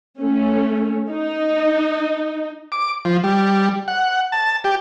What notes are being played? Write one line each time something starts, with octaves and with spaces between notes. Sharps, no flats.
A3 C#4
D#4
D6
F3
G3
F#5
A5
G4